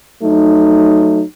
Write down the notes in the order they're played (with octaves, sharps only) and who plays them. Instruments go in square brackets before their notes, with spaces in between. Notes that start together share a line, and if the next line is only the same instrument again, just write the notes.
[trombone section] F#3 A3 D#4